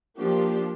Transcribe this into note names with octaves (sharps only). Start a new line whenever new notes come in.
F3 A#3 D4 G4